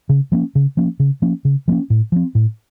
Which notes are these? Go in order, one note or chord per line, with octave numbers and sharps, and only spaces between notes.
C#3
F3 A#3 C#4
C#3
F3 A#3 C#4
C#3
F3 A#3 C#4
C#3
F3 A#3 C#4
A2
F3 C4
A2